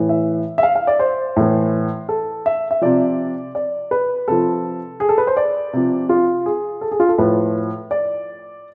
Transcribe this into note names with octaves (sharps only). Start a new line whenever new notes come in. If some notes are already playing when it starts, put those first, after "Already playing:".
Already playing: A2 E3
E5
E5
F5
F5
D5
C5
A2 E3
A4
E5
E5
C3 F3 D5
D5
B4
C3 F3 A4
G#4
A4
B4
C5
D5
C3 F3
F4
G#4
A4
G#4
F4
A4
A2 F3 B4
D5